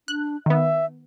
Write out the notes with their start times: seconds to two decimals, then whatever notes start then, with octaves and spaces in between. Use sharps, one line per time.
0.08 D4 F#6
0.46 D#3 B3 E5